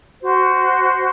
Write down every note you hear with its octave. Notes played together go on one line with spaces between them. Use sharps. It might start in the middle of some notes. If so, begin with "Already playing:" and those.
F#4 C5